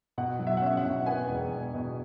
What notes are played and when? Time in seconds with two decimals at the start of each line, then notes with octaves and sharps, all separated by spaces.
0.18 B2 F#5
0.39 F#3
0.47 E5
0.57 F#5
0.62 C#4 E5
0.77 F#5
0.85 B2
1.06 B3 G#5
1.29 E1
1.52 E1
1.75 B2